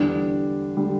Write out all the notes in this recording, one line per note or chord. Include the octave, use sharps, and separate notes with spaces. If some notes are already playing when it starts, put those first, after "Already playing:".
Already playing: E2 D3 G3 D4
D3 G3